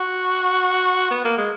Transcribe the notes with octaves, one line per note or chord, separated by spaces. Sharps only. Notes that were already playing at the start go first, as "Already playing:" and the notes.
Already playing: F#4
B3
A#3
G#3